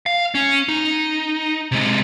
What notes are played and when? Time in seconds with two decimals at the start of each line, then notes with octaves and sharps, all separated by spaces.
0.06 F5
0.35 C#4
0.69 D#4
1.72 C3 G#3